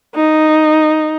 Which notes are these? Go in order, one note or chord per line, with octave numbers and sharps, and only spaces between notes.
D#4